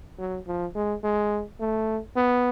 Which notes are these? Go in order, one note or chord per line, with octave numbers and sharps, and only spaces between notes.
F#3
F3
G#3
G#3
A3
B3